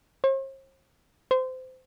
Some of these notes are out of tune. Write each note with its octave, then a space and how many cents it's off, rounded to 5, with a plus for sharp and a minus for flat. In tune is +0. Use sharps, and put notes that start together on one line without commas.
C5 +45
C5 -25